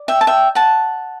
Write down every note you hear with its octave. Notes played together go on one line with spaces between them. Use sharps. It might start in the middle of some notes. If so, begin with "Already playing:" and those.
Already playing: D5
E5 G5
A5
E5 G5
F#5 A5